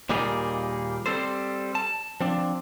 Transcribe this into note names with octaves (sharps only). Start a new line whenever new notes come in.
D#2 A#2 G3 A#3 D#4 G#4
G3 C4 A4 C5
A5
F3 C4 D4